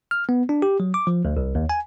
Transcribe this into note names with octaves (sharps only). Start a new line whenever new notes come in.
F6
B3
D4
G4
F#3
D6
F3
D2
C2
D#2
G#5